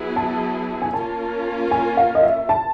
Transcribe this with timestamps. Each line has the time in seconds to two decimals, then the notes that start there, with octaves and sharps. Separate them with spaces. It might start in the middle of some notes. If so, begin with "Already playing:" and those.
Already playing: F#3 B3 E4 G#4
0.16 A5
0.82 G#5
0.94 A#3 C#4 F4 A#4 A5
1.71 G#5
1.97 F5
2.15 D#5
2.23 E5
2.49 A5